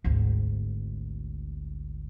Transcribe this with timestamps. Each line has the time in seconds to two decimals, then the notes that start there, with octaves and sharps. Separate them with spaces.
0.04 G#1 D2